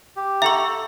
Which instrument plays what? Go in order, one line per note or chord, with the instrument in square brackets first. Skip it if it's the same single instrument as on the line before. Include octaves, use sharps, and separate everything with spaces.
[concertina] G4
[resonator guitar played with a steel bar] A4 F#5 A#5 [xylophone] E5 C#6